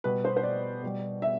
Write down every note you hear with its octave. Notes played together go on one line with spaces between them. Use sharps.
B2 G3 B4
C5
C5
D5
B2 G3
E5